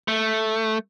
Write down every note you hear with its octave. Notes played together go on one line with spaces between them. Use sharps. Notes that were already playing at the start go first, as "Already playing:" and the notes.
A3